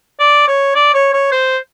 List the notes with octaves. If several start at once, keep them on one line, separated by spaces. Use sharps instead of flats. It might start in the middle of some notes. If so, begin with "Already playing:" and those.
D5
C#5
D5
C#5
C#5
C5